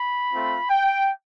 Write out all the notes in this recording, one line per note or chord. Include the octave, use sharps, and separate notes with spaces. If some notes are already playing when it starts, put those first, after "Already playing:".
Already playing: B5
A3 C4 F4
G5